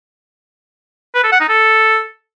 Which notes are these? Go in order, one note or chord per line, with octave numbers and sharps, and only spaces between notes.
B4
A4
F#5
D#4
A4